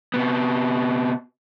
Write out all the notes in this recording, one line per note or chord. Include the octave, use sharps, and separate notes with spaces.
C3 B3